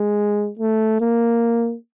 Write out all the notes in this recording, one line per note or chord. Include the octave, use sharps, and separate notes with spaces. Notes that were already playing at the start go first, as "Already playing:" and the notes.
Already playing: G#3
A3
A#3